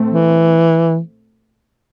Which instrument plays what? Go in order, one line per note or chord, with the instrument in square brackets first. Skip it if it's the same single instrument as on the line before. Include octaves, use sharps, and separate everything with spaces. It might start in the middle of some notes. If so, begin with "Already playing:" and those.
Already playing: [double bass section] A#2 A3 C4
[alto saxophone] E3